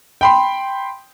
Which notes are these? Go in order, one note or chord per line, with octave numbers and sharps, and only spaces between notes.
G5 B5 C6